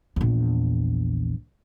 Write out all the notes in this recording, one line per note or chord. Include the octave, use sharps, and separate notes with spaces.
A#1 E2